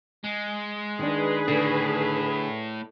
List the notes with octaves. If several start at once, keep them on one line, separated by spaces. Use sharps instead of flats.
G#3
D#3 D4 G#4 B4
A2 D3